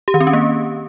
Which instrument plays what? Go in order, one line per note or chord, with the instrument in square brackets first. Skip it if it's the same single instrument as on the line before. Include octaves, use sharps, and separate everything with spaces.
[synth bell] G4
D#3
C4
C#4
A#3